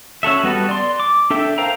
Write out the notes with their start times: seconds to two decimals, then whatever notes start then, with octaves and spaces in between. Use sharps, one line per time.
0.23 C#4 F#4 A4 E5
0.43 G3 B3 F#4 A4
0.69 D5 C6
1.00 D6
1.30 D4 A4 E5 G5
1.58 A#4 C5 F5 G5 A#5